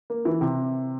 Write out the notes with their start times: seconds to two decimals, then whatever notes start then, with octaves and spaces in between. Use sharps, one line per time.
0.10 A#3
0.25 E3
0.41 C3